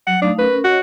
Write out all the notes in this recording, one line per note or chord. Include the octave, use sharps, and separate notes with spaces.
F#3 F#5
A3 D4 D#4 F5
C#4 A#4 B4
F#4 C#5 D#5